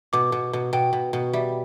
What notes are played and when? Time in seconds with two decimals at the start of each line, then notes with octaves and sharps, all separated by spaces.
0.13 B2 D6
0.32 B2
0.53 B2
0.73 B2 G5
0.93 B2
1.13 B2
1.33 G3 E5